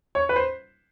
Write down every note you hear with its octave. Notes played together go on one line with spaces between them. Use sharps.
C#5
B4
C5